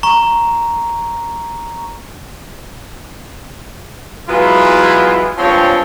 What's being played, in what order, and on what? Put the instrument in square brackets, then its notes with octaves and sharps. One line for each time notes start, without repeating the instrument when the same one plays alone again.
[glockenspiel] A#5 C#6
[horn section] E3 F#3 G#3 B3 E4 F4
G2 F3 G#3 C4 C#5